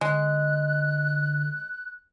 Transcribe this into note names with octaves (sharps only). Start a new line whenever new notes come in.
D3 G#3 F#6